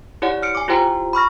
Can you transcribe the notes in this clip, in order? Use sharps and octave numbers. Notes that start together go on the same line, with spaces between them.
E4 G4 C#5 D5 F#5
F6 C#7 D7
G#5 D6
E4 F4 G4 C5 G5 A#5
B5 C#6 F6 A#6